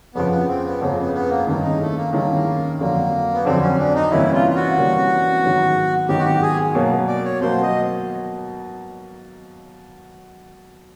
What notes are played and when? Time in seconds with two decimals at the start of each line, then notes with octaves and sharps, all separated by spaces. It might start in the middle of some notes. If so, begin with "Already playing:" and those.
0.15 F2 C#3 F3 B3
0.31 B3
0.48 C4
0.65 B3
0.81 F2 C#3 F3 A#3
0.98 B3
1.14 B3
1.30 A#3
1.47 G2 D#3 G#3 A#3 C#4 E4
1.63 D#4
1.80 A3
1.96 A#3
2.13 G2 D#3 G#3 A#3 C#4 E4
2.79 F2 D3 F#3 A#3
3.33 B3
3.45 F2 D3 F#3 C4
3.61 C#4
3.78 D4
3.95 D#4
4.11 C3 E3 G3 A#3 C#4 E4
4.33 F4
4.50 F4
4.56 F#4
4.77 C3 E3 G3 A#3 C#4
5.43 G#2 D#3 F#3 B3
6.08 G#2 D#3 F#3 B3 G4
6.19 F#4
6.25 G4
6.42 G#4
6.75 B2 F#3 A#3
7.07 D5
7.24 C#5
7.41 B2 F#3 A#3 C5
7.62 D#5